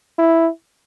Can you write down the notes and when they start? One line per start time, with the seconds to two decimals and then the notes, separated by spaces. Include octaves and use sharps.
0.19 E4